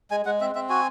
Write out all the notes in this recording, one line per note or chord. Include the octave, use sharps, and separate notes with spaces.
G#3 G#5
G#3 F#5
C4 E5
C4 E5
F#4 G#5